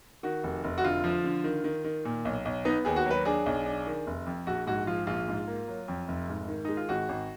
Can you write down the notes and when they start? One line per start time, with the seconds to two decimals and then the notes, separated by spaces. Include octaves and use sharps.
0.23 D#3 F#4
0.43 F1
0.64 F1
0.78 F#4
0.84 D3 F4
1.04 F3
1.24 D3
1.44 D#3
1.64 D#3
1.84 D#3
2.05 A#2
2.25 B1
2.45 B1
2.65 B3 D#4
2.85 D#2 G#4
2.96 F#4
3.06 F#3 B4
3.25 D4 G#4
3.46 B1
3.66 D4
3.87 D#3
4.07 F1
4.26 F2
4.47 A#1 F#4
4.67 G#2 F#4
4.87 F3 F4
5.07 A#1 F4
5.28 G#2
5.48 A#3
5.68 F#3
5.88 F2
6.08 F1
6.29 G#2
6.48 D#3
6.65 G#3 D#4
6.77 F4
6.89 G#1 F#4
7.09 G#1